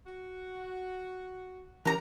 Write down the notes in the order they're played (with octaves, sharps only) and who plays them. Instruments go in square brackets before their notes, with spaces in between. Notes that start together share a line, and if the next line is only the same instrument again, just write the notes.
[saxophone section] F#4
[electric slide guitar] E3 C#4 G4 [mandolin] A#4 A#5